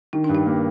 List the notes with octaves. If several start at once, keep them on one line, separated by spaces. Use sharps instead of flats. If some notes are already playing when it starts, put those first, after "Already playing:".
D#3 D#4
G2 D4
D#4
A#3